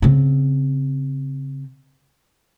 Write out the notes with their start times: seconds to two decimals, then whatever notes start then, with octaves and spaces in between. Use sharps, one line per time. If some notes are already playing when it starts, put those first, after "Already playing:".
0.02 C#3 C4